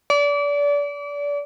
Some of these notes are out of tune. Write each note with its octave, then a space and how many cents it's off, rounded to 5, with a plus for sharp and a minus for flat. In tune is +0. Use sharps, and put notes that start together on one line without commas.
D5 -30